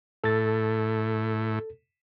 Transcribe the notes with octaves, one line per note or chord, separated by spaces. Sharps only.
A2 A4 A6